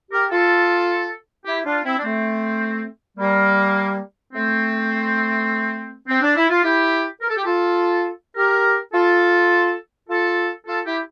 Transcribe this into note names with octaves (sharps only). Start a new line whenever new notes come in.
G4 A#4
F4 A4
E4 G4
D4 F4
C4 E4
D4
A3 C4
G3 A#3
A3 C4
C4
D4
E4
F4
E4 G4
A#4
A4
G4
F4 A4
G4 A#4
F4 A4
F4 A4
F4 A4
E4 G4